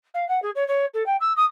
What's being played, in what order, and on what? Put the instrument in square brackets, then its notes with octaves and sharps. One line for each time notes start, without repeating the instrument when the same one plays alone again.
[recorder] F5
F#5
G#4
C#5
C#5
A4
G5
E6
D#6